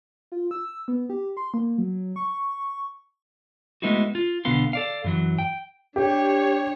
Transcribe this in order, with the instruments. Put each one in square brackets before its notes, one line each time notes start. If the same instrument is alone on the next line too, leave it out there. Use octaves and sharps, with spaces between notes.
[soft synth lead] F4
E6
B3
G4
C6
A#3
F#3
C#6
[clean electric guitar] G#3 A3 B3 D#4 E4 F#4
F4
B1 D3 B3 F5 C6
A4 D5 F5
F#2 E3 F#3
G5
[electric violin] D4 C#5 [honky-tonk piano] G4